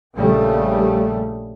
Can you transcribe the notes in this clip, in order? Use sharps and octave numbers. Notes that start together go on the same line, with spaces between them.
A#1 A#2 C#3 G3 A3